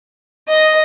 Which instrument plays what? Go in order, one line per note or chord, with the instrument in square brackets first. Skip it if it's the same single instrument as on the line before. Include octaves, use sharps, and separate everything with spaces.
[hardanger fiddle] D#5